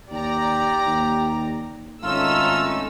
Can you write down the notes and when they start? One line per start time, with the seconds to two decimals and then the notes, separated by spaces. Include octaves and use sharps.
0.10 D#2 G4 D5 A#5
0.86 D#2
2.03 G#1 A3 C#4 D#4 F4 E6